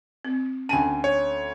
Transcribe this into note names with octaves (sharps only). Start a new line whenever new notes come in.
C4
D2 C#4 G5 G#5 D#7
C#5